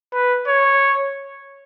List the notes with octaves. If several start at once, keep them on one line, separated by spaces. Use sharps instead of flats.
B4
C#5